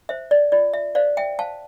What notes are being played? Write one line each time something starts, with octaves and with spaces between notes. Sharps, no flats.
C5 E5
D5
F4 D5
E5
C5 D5 F5
E5 G5
C5 F5 A5